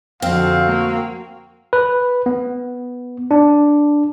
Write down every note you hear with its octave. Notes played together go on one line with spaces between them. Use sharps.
F2 D3 C4 F#4 F5
A#3
B4
B3
D4